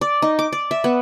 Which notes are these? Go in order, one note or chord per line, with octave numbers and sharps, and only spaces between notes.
D5
D#4
D6
D5
E5
B3